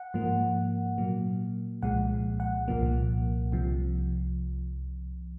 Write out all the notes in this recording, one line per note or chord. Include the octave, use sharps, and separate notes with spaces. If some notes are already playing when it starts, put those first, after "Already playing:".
Already playing: F#5
G#2 F3 A#3
A#2 F#3 A#3
C2 A#2 F3 G#3 F#5
F#5
C2 A#2 F3 A#3
C2 C3 F3